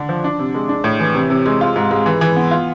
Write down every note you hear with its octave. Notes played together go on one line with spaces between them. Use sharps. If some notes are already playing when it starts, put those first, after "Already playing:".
Already playing: D3 D4
F3
D4
C3
G#3
D4
A2
E3
C3
C3
G#3
F4
G#2
G#3
E3
E3
B3
F4